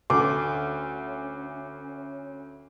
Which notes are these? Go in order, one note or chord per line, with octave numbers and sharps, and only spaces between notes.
D2 C#4 D6